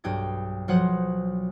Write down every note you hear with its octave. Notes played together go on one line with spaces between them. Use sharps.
B1 G2 G5 D#6 G#6
B1 F3 F#3 C5 F#5 D#6